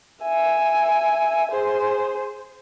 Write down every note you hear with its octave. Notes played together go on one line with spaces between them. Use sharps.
E5 G#5
G#4 C5